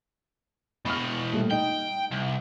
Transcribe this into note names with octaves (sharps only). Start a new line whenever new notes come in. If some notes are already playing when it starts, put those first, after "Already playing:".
B2 G#3 B5 C#6 F6
A#2 G3 A3
D#4 D#5 G5
C2